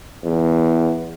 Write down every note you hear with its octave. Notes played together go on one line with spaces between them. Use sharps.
E2